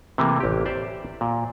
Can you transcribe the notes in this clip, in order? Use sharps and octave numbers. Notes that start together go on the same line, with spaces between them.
C3 E3 A3 A#3
A1 G4
G4 C5 D5 E5
A#2